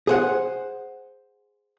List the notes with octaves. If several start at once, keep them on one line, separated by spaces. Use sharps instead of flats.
G#4 C5 F#5